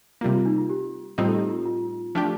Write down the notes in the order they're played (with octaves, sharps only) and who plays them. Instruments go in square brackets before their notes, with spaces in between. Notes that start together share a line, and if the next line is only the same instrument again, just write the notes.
[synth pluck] C3 G3 A#3 [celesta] F4
[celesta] F4
D#4
F4
G4
[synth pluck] A2 G3 C4 D#4 [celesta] F4
[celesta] A4
G4
F4
F4
[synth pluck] F3 A3 D4 G4